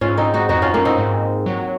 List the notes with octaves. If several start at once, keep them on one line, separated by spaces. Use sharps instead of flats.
G#2 C#4 F4
C4 D#4
D#4 F#4
F2 D#4 F#4
C#4 F4
F#2 A#3 C#4
C4 D#4
G#2
F#3